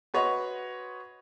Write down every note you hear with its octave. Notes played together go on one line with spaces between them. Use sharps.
F#4 B4 C#5 D#5 F#5 C6